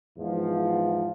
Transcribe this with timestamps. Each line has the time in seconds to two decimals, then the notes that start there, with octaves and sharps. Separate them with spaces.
0.17 E2 G#2 F3